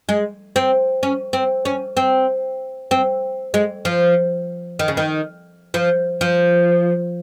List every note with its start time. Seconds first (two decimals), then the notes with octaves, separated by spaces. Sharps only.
0.09 G#3
0.56 C4
1.03 C#4
1.33 C4
1.65 C#4
1.97 C4
2.91 C4
3.54 G#3
3.85 F3
4.79 D#3
4.88 C#3
4.97 D#3
5.74 F3
6.21 F3